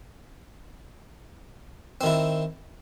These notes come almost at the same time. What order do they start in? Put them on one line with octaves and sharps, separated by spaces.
C4 D#3 E4